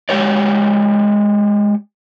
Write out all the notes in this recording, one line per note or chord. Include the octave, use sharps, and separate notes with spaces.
G#3 G4 C#5 D5